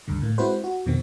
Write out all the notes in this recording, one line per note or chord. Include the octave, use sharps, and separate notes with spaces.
C#2 G2 D3
A2 A#3
G#3 C4 E4 F#4 B4 C5
F#4
F2 B2 D#3 C4